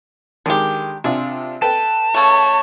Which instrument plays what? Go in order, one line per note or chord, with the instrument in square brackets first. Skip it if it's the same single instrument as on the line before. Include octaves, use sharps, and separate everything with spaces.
[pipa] D3 G4 [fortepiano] D#3 G#3
[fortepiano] C3 D4 F4 [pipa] G#4
[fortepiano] A4 B4 G5 [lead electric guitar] A5
[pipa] C#3 A3 [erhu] C#5